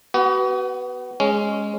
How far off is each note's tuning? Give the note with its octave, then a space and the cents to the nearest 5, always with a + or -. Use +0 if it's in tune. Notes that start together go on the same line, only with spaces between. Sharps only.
B3 +0 F#4 +35
G#3 +0 C#4 +0